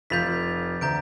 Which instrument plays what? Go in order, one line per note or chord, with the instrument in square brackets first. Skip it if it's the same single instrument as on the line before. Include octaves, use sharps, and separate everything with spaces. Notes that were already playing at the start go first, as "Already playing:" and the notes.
[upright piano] F1 F4 F7 [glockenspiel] G6 A6 B6
[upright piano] D2 [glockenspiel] A#5 G6 D7